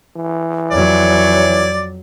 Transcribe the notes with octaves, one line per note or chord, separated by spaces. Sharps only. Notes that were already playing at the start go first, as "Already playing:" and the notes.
E3
F2 F#3 C#5 D5